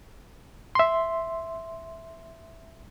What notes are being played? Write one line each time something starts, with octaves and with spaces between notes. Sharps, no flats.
E5 C6